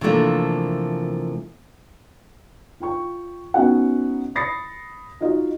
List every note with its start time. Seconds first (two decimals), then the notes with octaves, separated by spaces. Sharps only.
0.01 C3 E3 F3 A3 A#3 D4
2.80 F4 G5 C#6
3.54 B3 C#4 D#4 F#4 F#5
4.35 B5 D#6 A6 A#6 C7 C#7
5.21 D#4 F4 F#4 D#5